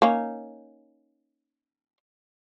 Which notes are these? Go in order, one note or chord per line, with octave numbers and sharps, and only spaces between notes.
A#3 C#4 D#4